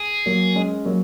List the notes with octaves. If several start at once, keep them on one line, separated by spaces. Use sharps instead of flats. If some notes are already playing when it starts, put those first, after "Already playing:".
Already playing: G#4
F#3 A#3
G#3 C#4
F#3 A#3